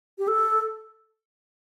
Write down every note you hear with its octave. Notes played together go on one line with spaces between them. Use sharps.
G4
A4